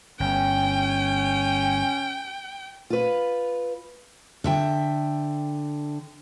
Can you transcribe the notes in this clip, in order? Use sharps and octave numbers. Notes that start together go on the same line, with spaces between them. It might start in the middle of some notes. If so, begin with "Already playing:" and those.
G1 C#4 G5
F4 B4
D3 E5 G5